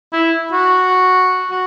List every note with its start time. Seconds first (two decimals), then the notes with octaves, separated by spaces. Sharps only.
0.12 E4
0.53 F#4
1.51 F#4